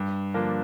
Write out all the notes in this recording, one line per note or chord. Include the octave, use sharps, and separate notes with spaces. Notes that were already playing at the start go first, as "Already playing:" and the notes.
Already playing: G2
D3 F3 A#3 D4